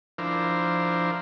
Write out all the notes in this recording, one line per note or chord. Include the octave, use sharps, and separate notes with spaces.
F3 D4 E4 A#4 C5